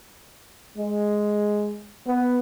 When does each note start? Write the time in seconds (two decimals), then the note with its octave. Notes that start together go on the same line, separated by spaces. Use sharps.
0.76 G#3
2.07 B3